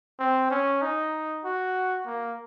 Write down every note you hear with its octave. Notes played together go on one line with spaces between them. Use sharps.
C4
C#4
D#4
F#4
A#3